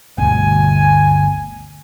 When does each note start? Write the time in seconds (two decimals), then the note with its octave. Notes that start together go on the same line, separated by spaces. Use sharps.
0.18 G1 D2 B2 G#5